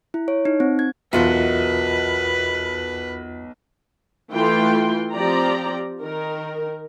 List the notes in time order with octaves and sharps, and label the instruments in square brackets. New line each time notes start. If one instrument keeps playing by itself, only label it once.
[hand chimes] E4
C#5
D#4
C4
G#6
[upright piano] B1 [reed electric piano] E2 F4 E5 [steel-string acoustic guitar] F#4 A#4 D#5 [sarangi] B4
[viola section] E3 A3 F4 G5 C6
F3 C4 G4 D5 A#5
D#3 A#4